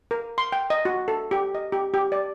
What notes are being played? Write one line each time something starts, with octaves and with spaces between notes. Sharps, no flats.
A#4
C6
G5
D#5
F#4
A4
G4
D#5
G4
G4
D5